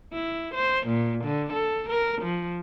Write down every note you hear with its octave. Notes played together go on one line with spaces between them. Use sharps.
E4
C5
A#2
D3
A4
A#4
F3